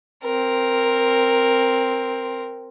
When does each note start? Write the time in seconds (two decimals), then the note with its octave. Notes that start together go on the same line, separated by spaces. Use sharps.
0.24 C4 A#4